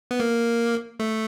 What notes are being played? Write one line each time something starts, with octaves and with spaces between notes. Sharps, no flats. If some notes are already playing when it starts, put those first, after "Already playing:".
B3
A#3
A3